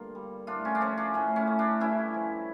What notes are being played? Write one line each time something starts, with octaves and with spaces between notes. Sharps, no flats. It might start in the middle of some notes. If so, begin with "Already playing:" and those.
Already playing: G2 D3 A#3 F4
G3
A2 D4 F4
C#4
D4
F3 C#4
D4
A2 C#4
C#4
A3
D4
G2 C#4 E4
F3